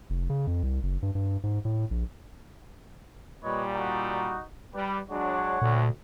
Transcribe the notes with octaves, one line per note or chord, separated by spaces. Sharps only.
F1
C#3
F2
C2
F#1
G2
G2
G#2
A2
A#1
A#2 G3 B4 C#5 D#5
D#4 F#4
G3 G4 B4
F#3 G#3 D4 C#5 F#5
D2 A#2